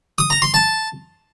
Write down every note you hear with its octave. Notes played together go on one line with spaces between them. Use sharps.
D#6
A#5
C6
A5